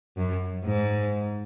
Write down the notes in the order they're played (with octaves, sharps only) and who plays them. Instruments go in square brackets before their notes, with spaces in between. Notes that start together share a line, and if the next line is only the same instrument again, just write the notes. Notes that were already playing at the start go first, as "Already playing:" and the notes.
[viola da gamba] F#2
G#2